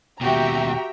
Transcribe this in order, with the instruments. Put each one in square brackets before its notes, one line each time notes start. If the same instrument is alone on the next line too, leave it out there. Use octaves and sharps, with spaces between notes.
[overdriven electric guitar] D#2 B2 [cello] F#4 G4 [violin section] E5 G5 A#5